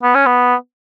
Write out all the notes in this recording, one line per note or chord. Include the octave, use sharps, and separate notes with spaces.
B3
C#4
B3